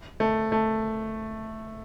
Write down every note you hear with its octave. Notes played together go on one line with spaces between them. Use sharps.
A3
A3